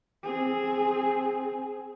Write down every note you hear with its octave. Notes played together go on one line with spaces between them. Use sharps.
C4 G#4